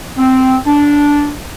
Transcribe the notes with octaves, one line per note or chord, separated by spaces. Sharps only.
C4
D4